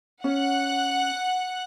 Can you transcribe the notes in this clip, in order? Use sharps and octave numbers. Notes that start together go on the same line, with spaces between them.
C#4 F#5 F#6